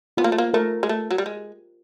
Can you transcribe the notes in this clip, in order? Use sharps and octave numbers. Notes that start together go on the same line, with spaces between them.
B3 F4
A#3
A3
A#3
A3 A#4
G#3
A3
F#3
G3
G#3